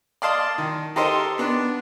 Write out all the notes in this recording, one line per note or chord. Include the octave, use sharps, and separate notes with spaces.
D5 D#5 F5 A5 C6 D#6
D#3
D#4 G4 A4 A#4 C5 D#5
B3 D4